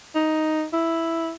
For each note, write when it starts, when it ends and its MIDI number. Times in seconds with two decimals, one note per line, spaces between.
0.15 0.64 63
0.73 1.31 64